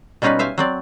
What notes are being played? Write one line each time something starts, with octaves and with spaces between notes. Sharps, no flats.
B2 G3 C#4 D#4 F4 B4
C5 E5 F5 G#5
F#3 C4 D5